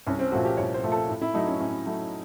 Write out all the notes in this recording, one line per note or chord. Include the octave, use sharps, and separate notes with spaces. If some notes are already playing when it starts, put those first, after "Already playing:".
C2 C#4
C4
A#2 F3 A3 F#4
G4
C2 C#5
C5
A#2 F3 A3
A4
A2
E4
F#3 A3 D#4
C#4
A2 C#4
F#3 A3